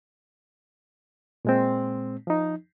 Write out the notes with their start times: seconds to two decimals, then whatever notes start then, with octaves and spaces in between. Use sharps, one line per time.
1.45 A#2 G#3 C4
2.27 F3 D#4